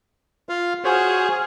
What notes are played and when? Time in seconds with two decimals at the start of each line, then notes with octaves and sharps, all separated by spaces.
0.49 F4 F5
0.84 F#4 G#4 C5 C#5 F6